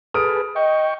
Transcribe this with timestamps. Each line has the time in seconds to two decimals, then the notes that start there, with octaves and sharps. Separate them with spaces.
0.14 G#4 A4 B4 D#6 F6 D7
0.56 D#5 G5 C#6